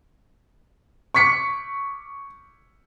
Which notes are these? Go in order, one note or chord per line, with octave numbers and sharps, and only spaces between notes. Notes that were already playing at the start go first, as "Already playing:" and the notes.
C#6 D6 B6 C#7